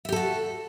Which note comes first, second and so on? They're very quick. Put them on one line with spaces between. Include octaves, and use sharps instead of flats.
E5 G4 A4 F#4